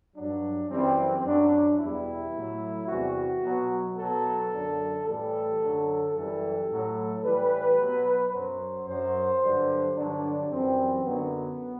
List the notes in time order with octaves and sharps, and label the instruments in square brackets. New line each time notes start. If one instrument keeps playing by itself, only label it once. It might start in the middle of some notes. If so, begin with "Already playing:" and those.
[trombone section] G2 F#3 D4
F#2 E3 G3 C4
F#2 F#3 D4
E2 B2 G3 E4
A2 F#3
E2 C3 E3 G3 F#4
B2 F#3
B2 F#3 A4
F#2 D3 F#3
A2 E3 G3 A4
F#2 D3 F#3
F#2 E3 G3 A4
A2 F#3
A2 E3 G3 B4
B2 F#3
F#2 F#3 C5
F#2 F#3 C5
G2 D3 F#3
G2 D3 F#3 D4
F#2 E3 G3 C4
F#2 D3 F#3 B3